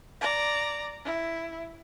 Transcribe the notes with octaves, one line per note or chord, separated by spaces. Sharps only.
D5 A#5
E4